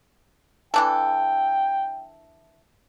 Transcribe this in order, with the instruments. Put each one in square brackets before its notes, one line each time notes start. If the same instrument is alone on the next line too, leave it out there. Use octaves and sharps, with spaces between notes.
[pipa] E3 D4 A4 [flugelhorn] G5